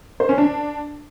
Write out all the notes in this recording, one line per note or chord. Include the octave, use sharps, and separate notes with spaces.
C5
C#4
D4